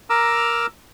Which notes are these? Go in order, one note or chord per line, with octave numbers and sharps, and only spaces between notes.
A#4 A#5 D6 E6 F6